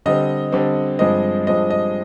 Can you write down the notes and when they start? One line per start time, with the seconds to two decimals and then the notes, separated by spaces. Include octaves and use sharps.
0.06 D3 G3 C4 D#5
0.52 D3 G3 C4
0.99 G2 F3 G#3 C4 D#5
1.47 G2 F3 G#3 C4 D#5
1.70 D#5